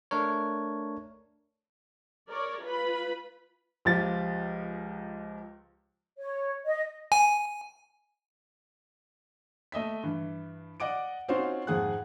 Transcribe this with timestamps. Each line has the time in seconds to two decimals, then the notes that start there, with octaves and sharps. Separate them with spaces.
0.11 A3 D4 A#4 C#5
2.26 A#4 C#5 D5
2.61 F4 B4 B5
3.85 C#2 F3 G4 A6
6.18 C#5
6.66 D#5
7.12 G#5
9.72 A3 D#5 E5 B6
10.03 G2 E3
10.80 D5 D#5 F#5 D6 D7
11.28 C4 C#4 D#4 F4 F#4 C5
11.67 F2 G#2 G#4 F#5 F#6